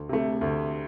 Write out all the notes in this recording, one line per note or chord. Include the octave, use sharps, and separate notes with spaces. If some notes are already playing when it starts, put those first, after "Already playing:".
Already playing: D2
C3 A3
D2